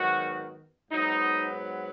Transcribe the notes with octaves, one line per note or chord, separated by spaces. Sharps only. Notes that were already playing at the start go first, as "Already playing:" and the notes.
Already playing: G#2 D#3 F#3 B3 F#4
G#2 F#3 B3 D#4